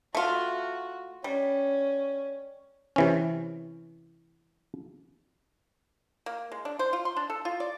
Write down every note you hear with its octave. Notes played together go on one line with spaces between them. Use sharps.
A3 F4 F#4
G3 C#4
C3 E3 C#4
A#3
G#3
D4
C5
F4
C6
D4
A4
F4
D5